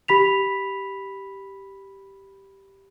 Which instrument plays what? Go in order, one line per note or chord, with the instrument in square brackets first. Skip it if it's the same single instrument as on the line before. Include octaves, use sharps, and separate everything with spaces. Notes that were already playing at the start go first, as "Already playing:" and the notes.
[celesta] G4 B5 B6 F7